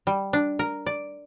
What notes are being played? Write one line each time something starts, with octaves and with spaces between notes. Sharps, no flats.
G3
D4
A#4
D5